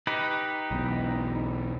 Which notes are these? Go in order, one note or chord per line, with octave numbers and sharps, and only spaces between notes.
D#4 G4 B4
B1 E2